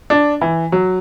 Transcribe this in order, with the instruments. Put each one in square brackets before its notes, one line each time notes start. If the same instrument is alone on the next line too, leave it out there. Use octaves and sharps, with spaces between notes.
[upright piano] D4
E3
F#3